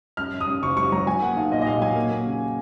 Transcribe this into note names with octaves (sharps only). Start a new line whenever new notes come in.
F#2 F6
F#2
D#6
F#2
F#1 C#6
F#3 C#6
F#3 A#5
F#3 G#5
A#3 F#5
B1 F5
A#2 D#5
D#5
A#2 F5
F#3 G#5
A#3
A#3
C#3